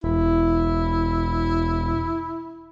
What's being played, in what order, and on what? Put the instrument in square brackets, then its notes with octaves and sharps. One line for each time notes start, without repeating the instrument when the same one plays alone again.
[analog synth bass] E1 [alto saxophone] E4